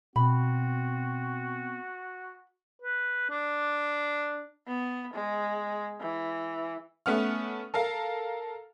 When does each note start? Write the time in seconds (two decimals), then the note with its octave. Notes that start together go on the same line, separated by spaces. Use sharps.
0.16 B2 C4 F#4 B5
2.82 B4
3.30 D4
4.67 B3
5.14 G#3
6.01 E3
7.06 A3 B3 C#4 F#5 F6
7.74 A4 A#4 F5